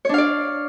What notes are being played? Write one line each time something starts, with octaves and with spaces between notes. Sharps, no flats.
D4 C#5 D5 F5